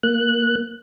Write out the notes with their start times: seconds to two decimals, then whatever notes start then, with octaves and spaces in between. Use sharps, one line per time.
0.03 A#3 F#6